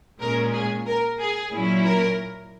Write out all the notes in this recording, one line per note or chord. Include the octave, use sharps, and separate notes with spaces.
A#2 G#3 C#4 A#4
G#4
A#4
G#4
A#2 F#3 C#4 E4
A#4